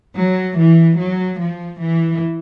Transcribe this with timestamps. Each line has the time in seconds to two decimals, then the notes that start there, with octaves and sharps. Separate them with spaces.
0.15 F#3
0.56 E3
0.97 F#3
1.39 F3
1.80 E3